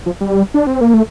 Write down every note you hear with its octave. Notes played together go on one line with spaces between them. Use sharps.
F3
G3
D4
C4
A#3
A3